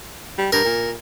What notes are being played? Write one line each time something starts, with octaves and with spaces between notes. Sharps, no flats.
G3
G2 A#4
A#2